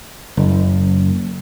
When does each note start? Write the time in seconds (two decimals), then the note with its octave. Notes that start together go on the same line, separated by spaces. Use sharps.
0.37 F#1